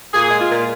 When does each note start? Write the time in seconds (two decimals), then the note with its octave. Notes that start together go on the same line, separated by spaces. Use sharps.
0.13 A#2 G#4
0.31 G#3
0.40 F4
0.48 A#2